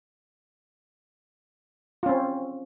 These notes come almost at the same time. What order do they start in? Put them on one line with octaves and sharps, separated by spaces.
F4 C#4 C4